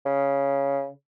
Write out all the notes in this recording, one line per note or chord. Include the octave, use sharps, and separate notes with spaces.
C#3